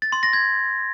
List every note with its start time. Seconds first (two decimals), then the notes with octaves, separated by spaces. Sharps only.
0.02 A6
0.12 C6
0.23 A#6
0.33 G#6